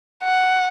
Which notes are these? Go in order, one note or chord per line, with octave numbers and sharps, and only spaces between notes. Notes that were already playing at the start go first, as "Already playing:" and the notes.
F#5